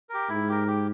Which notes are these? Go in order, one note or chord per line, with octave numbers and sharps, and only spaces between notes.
G4 A#4
G#2 E4
G4 A#4
G4